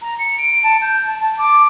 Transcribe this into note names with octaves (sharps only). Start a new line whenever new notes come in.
A#5
C#7
D7
A5
G6
A5
A5
D6